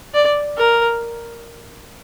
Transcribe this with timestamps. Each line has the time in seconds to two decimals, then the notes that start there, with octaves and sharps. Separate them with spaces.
0.14 D5
0.58 A#4